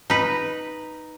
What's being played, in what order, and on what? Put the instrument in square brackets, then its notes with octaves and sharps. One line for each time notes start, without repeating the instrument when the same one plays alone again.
[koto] D#4 B4